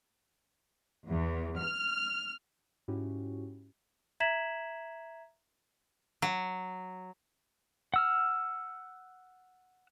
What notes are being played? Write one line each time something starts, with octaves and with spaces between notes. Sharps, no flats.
E2
F6
G#2 C#4 E4 F#4 G4
E5 A#5 G#6 B6 E7 F#7
F#3
F#5 E6 F6